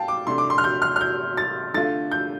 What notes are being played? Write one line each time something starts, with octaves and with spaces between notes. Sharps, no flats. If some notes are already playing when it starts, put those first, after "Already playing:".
Already playing: A2 F5 G5 A5
D6
C3 A3 D4 C6
D6
C6
F6
G6
F6
F6
G6
A6
D3 A3 F4 A6
G6